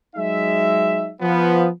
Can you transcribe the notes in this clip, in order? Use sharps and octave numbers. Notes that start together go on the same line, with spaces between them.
F#3 G#3 D#4 E5
F3 B3